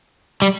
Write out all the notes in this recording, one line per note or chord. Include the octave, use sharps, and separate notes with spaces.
G3